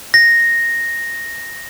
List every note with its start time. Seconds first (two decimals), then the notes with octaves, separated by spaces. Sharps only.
0.14 A#6